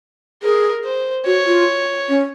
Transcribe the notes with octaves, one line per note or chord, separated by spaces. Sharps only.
G#4 A#4
C5
F#4 C#5
F4
C#4